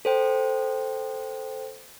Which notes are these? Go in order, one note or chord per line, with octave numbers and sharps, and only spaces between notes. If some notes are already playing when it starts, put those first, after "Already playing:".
A4 C5 G5